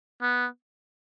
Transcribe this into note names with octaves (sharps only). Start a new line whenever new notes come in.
B3